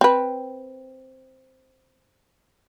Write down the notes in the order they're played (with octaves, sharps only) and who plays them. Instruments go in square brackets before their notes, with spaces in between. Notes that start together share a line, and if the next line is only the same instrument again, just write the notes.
[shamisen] C4 B4